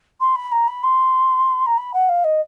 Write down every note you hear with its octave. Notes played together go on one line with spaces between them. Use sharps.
C6
B5
A#5
B5
C6
A#5
B5
F#5
F5
D#5